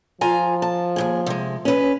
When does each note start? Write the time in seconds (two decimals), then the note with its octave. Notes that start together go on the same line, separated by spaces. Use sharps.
0.21 F3 F4 G#5 A#5
0.62 A5
0.96 D#2 G#2 G#4
1.26 C3 G#3
1.65 C#4 B4